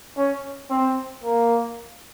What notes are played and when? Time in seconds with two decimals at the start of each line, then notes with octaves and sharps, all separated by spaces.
0.17 C#4
0.70 C4
1.23 A#3